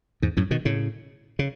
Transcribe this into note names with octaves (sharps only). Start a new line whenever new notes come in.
E2 G#2
F#2 A2
B2 D#3
A2 C#3
C#3